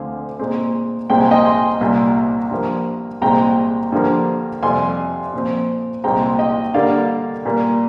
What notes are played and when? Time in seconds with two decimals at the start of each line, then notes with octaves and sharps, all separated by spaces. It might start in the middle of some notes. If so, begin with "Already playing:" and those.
Already playing: D2 D3 F3 C4 F5 G#5
0.39 A#2 G#3 C4
1.10 C2 A#2 G#3 C4 G5
1.21 G#5
1.31 D#5 G5
1.45 G#5 C6
1.81 C2 A#2 G3
2.51 G2 F3 A#3
3.22 C2 A#2 G#3 C4 G5 A#5
3.92 G2 D3 F3 A#3
4.63 F2 C3 G3 G#5 C6
5.33 A#2 F3 C4
6.04 C2 A#2 G#3 C4 G5 A#5
6.39 D#5 G5
6.74 G2 D3 G3 A#3 D5 F5
7.45 A#2 G3 A#3